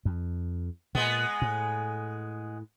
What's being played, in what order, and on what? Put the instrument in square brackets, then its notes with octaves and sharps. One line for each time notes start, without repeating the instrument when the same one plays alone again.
[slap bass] F2
[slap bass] A#2 [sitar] G#3 B3
[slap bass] A2